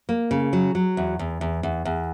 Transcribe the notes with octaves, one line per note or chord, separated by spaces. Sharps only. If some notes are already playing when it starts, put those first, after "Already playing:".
A#3
C#3
F#3
F#3
E2
E2
E2
E2
E2